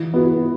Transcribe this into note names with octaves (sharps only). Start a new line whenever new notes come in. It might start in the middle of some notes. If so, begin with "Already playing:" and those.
Already playing: E3
B3 F#4